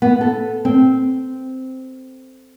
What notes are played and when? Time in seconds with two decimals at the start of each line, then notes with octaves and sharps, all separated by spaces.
0.02 B3
0.21 A4
0.65 C4